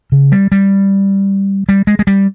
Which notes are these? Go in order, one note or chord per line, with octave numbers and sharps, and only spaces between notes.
C#3
G3
G3
G3
G#3
G#3
G3